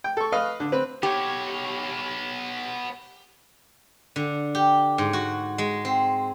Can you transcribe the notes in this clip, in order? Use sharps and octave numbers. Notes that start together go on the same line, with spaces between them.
G5
A4 C#6
B4 D#5 F5 F6
D3
C4 B4
B3 G4 C#5
D3
G4
G#2
F#4
G#3
C4